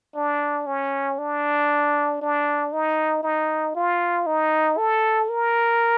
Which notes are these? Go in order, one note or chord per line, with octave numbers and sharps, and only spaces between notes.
D4
C#4
D4
D4
D#4
D#4
F4
D#4
A4
A#4